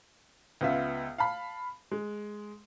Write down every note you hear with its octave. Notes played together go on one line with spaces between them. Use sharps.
C#2 B3 F4 E5
F5 A5 B5
G#3